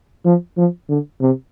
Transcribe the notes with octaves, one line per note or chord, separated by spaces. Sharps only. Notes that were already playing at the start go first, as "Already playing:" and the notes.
F3
F3
D3
C3